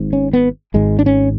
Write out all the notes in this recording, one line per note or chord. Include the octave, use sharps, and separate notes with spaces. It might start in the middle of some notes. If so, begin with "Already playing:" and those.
Already playing: G#1 G#2
C#4
B3
G#1 G#2 G#3
D4
C#4